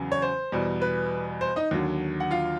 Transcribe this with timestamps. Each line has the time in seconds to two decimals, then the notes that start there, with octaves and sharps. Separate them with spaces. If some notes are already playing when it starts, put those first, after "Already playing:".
Already playing: E2 C#3 F#3
0.12 C#5
0.22 C5
0.52 E2 B2 G3
0.82 B4
1.41 C5
1.56 D#4 D#5
1.71 D#2 D3 F#3
2.20 F#5
2.31 F4 F5